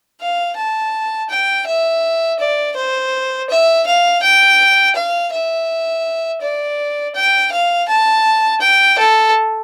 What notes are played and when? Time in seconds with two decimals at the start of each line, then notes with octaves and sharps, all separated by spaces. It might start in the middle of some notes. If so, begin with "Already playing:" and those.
0.21 F5
0.57 A5
1.30 G5
1.67 E5
2.39 D5
2.76 C5
3.50 E5
3.87 F5
4.23 G5
4.96 F5
5.32 E5
6.42 D5
7.15 G5
7.52 F5
7.88 A5
8.61 G5
8.98 A4